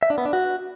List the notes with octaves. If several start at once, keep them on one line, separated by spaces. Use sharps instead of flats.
E5
D4
B3
D4
F#4